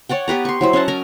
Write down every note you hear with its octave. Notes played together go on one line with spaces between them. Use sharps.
C#5 D5 F#5 G5
B3 G4 B4 A#5
C6 C#6
F#3 E4 C5
C#4 D#5 F#5 A5
A#4 G#5 A#5